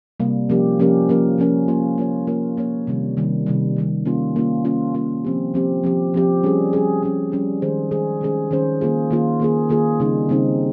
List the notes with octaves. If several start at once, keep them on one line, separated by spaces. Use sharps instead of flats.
C3 G3 A#3
F3 A#3 C#4 G4 A#4
F3 A#3 C#4 G4 A#4
F3 A#3 C#4 G4 A#4
F3 A#3 C#4 G4 A#4
A#3 F4 A#4 C#5
A#3 F4 A#4 C#5
A#3 F4 A#4 C#5
A#3 F4 A#4 C#5
C3 D#3 G3
C3 D#3 G3
C3 D#3 G3
C3 D#3 G3
A#3 C#4 F4
A#3 C#4 F4
A#3 C#4 F4
A#3 C#4 F4
F3 C4 G4
F3 C4 G4
F3 C4 G4
F3 C4 G4
G3 C#4 G#4
G3 C#4 G#4
G3 C#4 G#4
G3 C#4 G#4
D#3 G#3 C#4 G#4 C5
D#3 G#3 C#4 G#4 C5
D#3 G#3 C#4 G#4 C5
D#3 G#3 C#4 G#4 C5
D#3 A#3 F4 G#4
D#3 A#3 F4 G#4
D#3 A#3 F4 G#4
D#3 A#3 F4 G#4
C#3 G3 C4 D#4 G#4
C#3 G3 C4 D#4 G#4